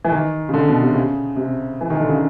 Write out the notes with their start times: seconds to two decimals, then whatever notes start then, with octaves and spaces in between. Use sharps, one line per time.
0.04 E3
0.12 D#3
0.49 C#3
0.54 D3
0.68 B2
0.82 C3
0.94 C#3
1.36 C3
1.81 E3
1.90 D#3
2.00 D3
2.09 C#3